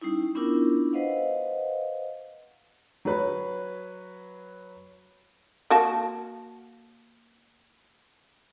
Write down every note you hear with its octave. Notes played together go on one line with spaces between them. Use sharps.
G3 C#4 D#4 E4
B3 C#4 D4 E4 F4 A#4
B4 C5 D#5 F5 F#5
F#3 B4 C#5
A#3 F#4 A5